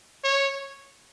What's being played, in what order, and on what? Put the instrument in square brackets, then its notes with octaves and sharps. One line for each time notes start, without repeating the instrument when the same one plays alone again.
[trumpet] C#5